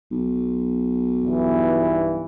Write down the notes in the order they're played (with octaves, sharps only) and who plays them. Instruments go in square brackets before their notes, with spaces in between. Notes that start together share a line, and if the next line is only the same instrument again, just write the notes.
[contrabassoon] B1
[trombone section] G2 E3